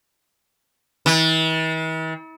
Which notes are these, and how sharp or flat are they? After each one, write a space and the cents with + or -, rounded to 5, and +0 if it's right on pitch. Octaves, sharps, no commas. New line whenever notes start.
E3 -45